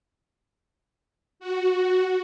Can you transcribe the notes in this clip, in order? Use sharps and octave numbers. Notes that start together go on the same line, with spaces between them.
F#4